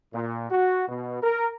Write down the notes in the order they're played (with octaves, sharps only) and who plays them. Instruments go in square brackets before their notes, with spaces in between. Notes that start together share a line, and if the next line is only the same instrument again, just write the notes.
[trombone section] A#2
F#4
B2
A#4